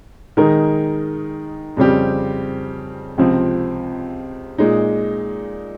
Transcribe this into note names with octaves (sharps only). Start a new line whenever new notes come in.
D#3 G#3 D#4 A#4
F2 C#3 G3 C4 G4
C#2 C3 F3 C4
A#2 G#3 D#4